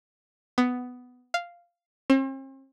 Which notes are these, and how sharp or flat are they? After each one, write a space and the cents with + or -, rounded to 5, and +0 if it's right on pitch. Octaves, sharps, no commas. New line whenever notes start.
B3 +10
F5 -5
C4 +45